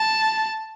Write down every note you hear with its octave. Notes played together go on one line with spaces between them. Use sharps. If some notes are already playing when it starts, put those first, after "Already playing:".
Already playing: A5